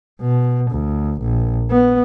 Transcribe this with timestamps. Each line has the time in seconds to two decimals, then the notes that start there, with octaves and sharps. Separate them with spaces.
0.21 B2
0.72 D2
1.22 A#1
1.71 B3